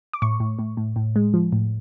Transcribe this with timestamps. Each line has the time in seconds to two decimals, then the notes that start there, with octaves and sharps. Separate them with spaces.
0.13 D6
0.22 A2 C#6
0.40 A2
0.59 A2
0.77 A2
0.96 A2
1.16 G#3
1.34 F3
1.53 A2